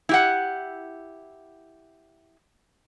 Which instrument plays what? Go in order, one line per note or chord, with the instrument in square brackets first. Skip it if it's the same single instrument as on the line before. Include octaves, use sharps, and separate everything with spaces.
[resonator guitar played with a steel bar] E4 G4 F#5